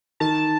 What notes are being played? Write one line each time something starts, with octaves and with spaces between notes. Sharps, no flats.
D#3 A5